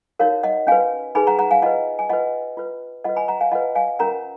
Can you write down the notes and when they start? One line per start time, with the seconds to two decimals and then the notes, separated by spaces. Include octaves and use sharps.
0.19 D#4 F#4 A#4 C#5 F5
0.43 D#5 F#5
0.67 C#4 F#4 B4 F5 G#5
1.15 D#4 G#4 B4 G#5 B5
1.27 F#5 A#5
1.39 F#5 A#5
1.51 F5 G#5
1.62 F4 B4 D#5 F#5
1.99 G#5
2.09 F4 B4 D#5 F#5
2.57 F4 B4
3.04 F4 B4 D#5 F#5
3.16 G#5 B5
3.28 F#5 A#5
3.41 F5 G#5
3.52 F4 B4 D#5 F#5
3.75 F5 G#5
3.99 C#4 F4 A#4 F#5 A#5